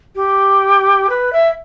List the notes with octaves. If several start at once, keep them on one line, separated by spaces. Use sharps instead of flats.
G4
B4
E5